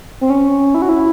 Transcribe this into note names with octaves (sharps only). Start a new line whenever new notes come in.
C4
C#4
E4
F#4
E4